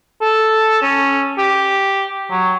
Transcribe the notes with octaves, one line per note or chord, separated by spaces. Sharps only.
A4
C#4
G4
F#3